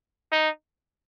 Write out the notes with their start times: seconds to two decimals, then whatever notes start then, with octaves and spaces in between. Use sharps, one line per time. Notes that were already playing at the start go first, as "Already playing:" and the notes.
0.32 D#4